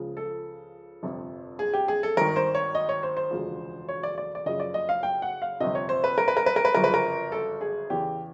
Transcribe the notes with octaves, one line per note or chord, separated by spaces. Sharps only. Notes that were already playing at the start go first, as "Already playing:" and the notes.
Already playing: C#2 C#3 F3
A4
G1 F2 C3 F3
G#4
G4
G#4
A4
G#1 G2 D#3 A#4
C5
C#5
D#5
C#5
C5
C5
E1 D2 C#3 F3
C#5
D5
D5
D5
F#1 F#2 C#3 F3 D#5
D5
D#5
F5
G5
F#5
F5
G1 F2 C3 D#5
C#5
C5
B4
A#4
B4
A#4
B4
A#4
B4
G1 F#2 C#3 F3 A#4
B4
A#4
A4
G#4
E2 C#3 E3 G4